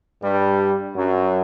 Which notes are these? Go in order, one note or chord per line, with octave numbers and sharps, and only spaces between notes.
G2 G3
F#2 F#3